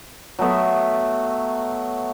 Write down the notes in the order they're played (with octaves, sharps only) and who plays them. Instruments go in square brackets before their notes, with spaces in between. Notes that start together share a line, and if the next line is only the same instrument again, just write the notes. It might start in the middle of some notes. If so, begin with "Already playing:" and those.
[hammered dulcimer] F#3 A3 B3 E5